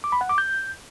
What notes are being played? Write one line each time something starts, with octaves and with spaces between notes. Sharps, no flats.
D6
B5
F#5
D6
G6